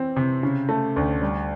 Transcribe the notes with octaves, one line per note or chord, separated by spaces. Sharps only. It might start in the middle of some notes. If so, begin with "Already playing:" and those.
Already playing: E3 C4
C3
C#3
A3
D2
G3